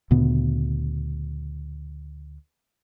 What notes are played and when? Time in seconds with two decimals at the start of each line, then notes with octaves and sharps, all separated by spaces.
0.11 D2 A#2 C#3 B3